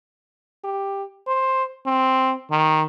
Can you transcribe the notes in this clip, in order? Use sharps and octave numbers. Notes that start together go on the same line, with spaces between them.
G4
C5
C4
D#3